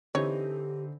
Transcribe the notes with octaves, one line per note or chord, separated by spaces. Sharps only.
D3 E3 C4 D#4 G4 C#5